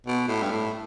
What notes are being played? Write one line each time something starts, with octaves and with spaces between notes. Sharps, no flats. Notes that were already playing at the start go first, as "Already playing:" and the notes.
B2
A2
G2
A2